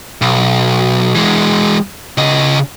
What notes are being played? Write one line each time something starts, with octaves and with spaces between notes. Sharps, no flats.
B1
E3 G#3
C#3 D#5